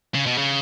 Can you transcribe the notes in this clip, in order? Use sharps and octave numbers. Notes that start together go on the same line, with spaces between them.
C#3
B2
C#3